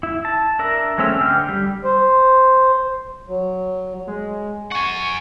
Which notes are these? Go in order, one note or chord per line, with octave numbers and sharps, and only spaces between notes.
E4
A5
D4 A#4 E5
G#3 A3 C4 C#4 E5
D3 D4 G5 F6
G3
C5
F#3
G#3
F#5 G#5 C#6